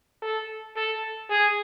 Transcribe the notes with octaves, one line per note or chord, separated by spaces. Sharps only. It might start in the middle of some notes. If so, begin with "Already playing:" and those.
A4
A4
G#4